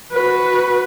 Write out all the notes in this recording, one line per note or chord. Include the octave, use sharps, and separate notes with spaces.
F#4 B4